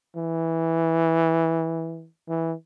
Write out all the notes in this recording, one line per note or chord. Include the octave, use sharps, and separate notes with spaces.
E3
E3